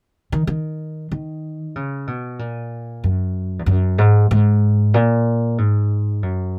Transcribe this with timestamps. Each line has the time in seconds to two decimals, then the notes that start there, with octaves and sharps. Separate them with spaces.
0.32 D#3
0.47 D#3
1.12 D#3
1.76 C#3
2.07 B2
2.39 A#2
3.04 F#2
3.59 E2
3.66 F#2
3.98 G#2
4.31 G#2
4.94 A#2
5.58 G#2
6.23 F#2